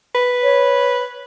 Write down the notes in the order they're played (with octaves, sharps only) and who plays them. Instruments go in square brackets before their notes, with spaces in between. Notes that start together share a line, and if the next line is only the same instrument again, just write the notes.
[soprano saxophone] B4
[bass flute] C#5